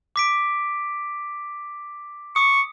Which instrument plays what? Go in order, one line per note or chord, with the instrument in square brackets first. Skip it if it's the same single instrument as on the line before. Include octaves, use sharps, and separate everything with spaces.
[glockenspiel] D6 B6 D7
[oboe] C#6 [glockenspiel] D#6 C#7